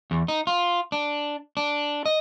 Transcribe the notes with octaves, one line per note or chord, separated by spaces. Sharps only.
E2
D#4
F4
D4
D4
D#5